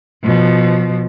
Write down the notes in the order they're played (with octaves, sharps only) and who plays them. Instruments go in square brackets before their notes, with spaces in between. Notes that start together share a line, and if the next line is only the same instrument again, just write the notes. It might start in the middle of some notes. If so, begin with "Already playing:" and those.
[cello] B2 F3